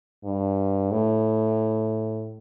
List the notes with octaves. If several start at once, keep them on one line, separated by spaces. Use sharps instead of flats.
G2
A2